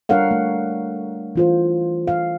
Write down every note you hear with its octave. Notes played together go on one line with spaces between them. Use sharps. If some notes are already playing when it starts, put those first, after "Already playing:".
G3 D4 A#4 C#5 F5 F#5
A3
E3 F4 C5
F5